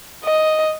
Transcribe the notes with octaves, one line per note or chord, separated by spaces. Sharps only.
D#5